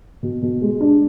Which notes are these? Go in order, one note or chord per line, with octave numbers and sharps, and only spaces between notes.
B2
B2
G#3
D4